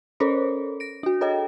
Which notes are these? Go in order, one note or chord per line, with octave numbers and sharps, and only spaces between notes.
C#4 A4 A#4 C5 C#5
A#6 D7
D4 F#4
G#4 A4 C#5 D#5 G5